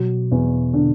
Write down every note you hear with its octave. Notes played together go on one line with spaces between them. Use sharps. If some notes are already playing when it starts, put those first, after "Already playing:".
Already playing: B2 F#3
E2
D3